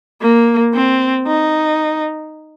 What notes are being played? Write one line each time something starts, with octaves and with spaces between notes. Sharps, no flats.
A#3
C4
D#4